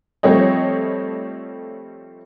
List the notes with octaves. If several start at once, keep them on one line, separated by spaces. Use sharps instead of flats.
F3 G3 A3 C4 C#5 D#5